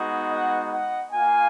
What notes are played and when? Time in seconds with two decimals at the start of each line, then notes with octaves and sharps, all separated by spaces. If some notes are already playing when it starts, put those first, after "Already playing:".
Already playing: G#3 B3 D#4 F#4
0.32 D#5 F#5
0.72 D#5 F#5
1.12 A#3 F4 F5 G#5